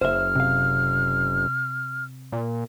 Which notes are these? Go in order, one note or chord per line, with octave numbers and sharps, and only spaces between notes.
F#1 C5 E5 F6
C3 F5
A#2